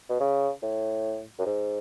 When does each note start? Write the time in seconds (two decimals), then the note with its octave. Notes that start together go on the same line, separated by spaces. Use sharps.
0.09 B2
0.20 C#3
0.63 A2
1.39 F#2
1.46 G#2